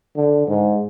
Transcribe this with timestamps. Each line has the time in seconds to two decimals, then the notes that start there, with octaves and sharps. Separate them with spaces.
0.16 D3
0.47 G#2